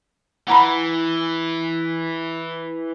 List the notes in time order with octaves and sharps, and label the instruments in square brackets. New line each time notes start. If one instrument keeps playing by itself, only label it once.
[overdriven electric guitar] E3 [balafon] F#5 A#5 B5